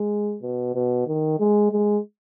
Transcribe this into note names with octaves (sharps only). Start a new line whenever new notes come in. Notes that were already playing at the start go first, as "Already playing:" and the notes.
Already playing: G#3
B2
B2
D#3
G#3
G#3